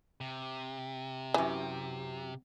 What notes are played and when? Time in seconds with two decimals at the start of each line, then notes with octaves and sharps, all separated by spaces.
0.21 C3
1.34 F#2 E3 G4